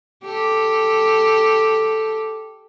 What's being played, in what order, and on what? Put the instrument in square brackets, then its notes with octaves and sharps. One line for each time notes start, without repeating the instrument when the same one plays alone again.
[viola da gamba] G4 A4